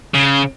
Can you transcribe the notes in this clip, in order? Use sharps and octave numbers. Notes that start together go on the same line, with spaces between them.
C#3